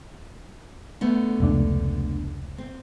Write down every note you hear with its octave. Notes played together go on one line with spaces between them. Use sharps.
D3 A3 B3
F1 C#2 D4
C4